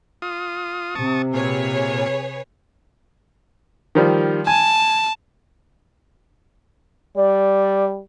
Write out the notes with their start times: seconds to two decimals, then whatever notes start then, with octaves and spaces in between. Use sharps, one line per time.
0.22 F4 D#6
0.95 C3 A5 C#6 D#6
1.34 A#2 G#4 B4 C#5
3.95 D#3 F3 G3
4.47 G#5 A5
7.16 G3 D5